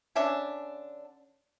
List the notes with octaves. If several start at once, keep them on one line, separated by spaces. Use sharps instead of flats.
D3 C#4 D4 E5